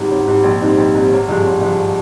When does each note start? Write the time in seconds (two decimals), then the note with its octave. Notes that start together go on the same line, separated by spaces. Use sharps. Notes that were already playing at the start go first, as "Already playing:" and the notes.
Already playing: G#1 G#2 G3
0.10 G#1
0.27 G#2 G3
0.44 A#1
0.61 G#2 G3 C4 D#4
0.78 A#1
0.95 G#2 G3 C4 D#4
1.11 G#1
1.28 G2 F3 G#3
1.45 G#1
1.62 G2 F3 G#3